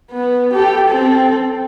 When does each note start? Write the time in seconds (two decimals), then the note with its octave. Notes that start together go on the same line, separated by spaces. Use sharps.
0.11 B3
0.54 G4 A4
0.88 C4 A4